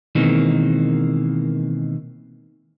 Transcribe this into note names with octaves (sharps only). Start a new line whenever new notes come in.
B2 D#3 E3 G#3 A#3 C4